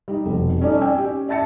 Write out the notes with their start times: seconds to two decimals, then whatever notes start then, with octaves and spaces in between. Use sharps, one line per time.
0.08 G3 D#4
0.26 F1 B2
0.61 G3 C#4 D#4 A4 D5
0.81 D5 G5 G#5 E6
0.95 C#4 G4
1.28 D5 E5 A5 A6 C#7